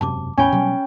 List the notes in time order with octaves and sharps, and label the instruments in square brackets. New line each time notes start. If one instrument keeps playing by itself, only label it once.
[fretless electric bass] E1 F#2 C3 [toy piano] A5 D6
[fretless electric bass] E2 A2 [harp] C#4 G5 [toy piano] G#5 B5
[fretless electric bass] B2 F#3 G3